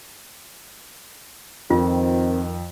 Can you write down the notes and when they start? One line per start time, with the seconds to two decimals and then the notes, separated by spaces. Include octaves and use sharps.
1.70 F2 D#3 C4 F4